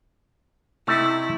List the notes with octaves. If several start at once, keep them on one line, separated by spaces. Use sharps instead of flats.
C3 A3 D#4 E4